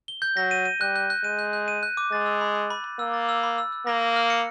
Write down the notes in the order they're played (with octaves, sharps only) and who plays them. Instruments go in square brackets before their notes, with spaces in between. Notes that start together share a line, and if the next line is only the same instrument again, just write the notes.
[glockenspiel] G7
G6
[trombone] F#3 [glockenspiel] A#6
[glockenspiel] D#7
D#7
[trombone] G3 [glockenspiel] F#6
[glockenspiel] F#6
F#6
[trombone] G#3 [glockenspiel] D#7
[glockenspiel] F#6
F#6
D#7
F#6
D6
[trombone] G#3 [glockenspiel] A6
[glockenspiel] E6
B5
B5
B5
B5
[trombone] A#3 [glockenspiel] E6
[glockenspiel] A6
E6
B5
E6
E6
[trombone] A#3 [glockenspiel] A#6
[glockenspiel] A#6
F6
C#7